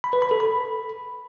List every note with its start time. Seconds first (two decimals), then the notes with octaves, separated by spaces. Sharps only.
0.04 B5
0.13 B4
0.22 B5
0.31 A4
0.40 B5